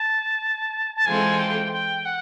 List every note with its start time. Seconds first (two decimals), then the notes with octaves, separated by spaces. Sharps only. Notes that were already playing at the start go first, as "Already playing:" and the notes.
Already playing: A5
0.96 A5
1.06 E3 G#3 C4 F4 A4 G#5
1.39 G5
1.72 G5
2.05 F#5